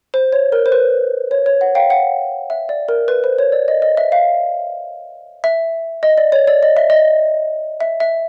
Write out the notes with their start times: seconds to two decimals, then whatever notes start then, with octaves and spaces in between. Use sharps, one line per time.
0.14 C5
0.32 C#5
0.52 A#4
0.66 C5
0.72 B4
1.31 C#5
1.46 C#5
1.61 F#5
1.75 F5 G5
1.90 F#5
2.50 E5
2.69 D5
2.89 A#4
3.08 B4
3.24 C5
3.39 C#5
3.52 D5
3.68 D#5
3.82 D#5
3.97 E5
4.12 F5
5.44 E5
6.03 D#5
6.18 D5
6.32 C#5
6.47 D5
6.63 D#5
6.77 E5
6.90 D#5
7.80 E5
8.00 E5